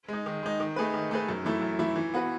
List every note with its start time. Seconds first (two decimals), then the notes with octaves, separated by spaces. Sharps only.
0.08 G#3 D#4
0.26 D#3
0.43 G#3 D#4
0.60 D#3
0.76 A3 D#4 G#4 B4
0.94 D#3
1.11 A3 D#4 G#4 B4
1.29 F#2
1.45 E3 A3 E4
1.62 F#2
1.79 E3 A3 E4
1.96 E3
2.14 B3 F#4 B4